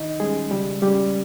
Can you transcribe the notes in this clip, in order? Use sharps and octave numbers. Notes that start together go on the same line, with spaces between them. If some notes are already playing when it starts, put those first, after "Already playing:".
Already playing: D#3 D#4 D#5
G3 G#3 C#4 G#4
C#3 G3 G4
G3 G#3 C#4 G4